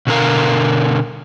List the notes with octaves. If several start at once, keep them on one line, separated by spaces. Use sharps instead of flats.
B2 D3 A#4 F5